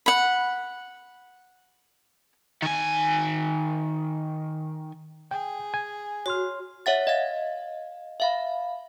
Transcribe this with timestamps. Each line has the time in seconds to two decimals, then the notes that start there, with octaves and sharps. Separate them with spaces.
0.06 F#5 B5
2.62 D#3 G#5
5.31 G#4 G5
5.74 G#5
6.26 F#4 C#5 C6 F6
6.86 C#5 E5 F#5 A6
7.07 D#5 F5 A6
8.20 E5 F5 B5